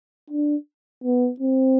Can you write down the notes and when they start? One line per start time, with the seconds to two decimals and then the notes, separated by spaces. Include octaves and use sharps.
0.30 D4
1.04 B3
1.40 C4